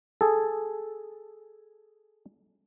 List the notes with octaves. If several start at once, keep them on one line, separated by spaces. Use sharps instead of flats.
G#4 A4